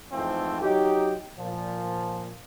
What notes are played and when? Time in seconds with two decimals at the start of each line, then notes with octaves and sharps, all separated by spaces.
0.12 F2 G#2 E3 F3 A3 C4
0.62 F#3 D#4 G4
1.38 A#2 F3